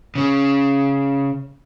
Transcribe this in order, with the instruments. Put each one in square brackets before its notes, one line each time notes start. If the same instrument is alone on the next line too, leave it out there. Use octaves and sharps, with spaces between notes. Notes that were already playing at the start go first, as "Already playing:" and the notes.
[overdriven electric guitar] C#3 C#4